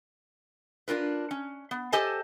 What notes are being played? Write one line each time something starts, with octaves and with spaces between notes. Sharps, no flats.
D4 F4 A#4 B4
C#4
B3
G4 A4 C5 D#5 G#5 A5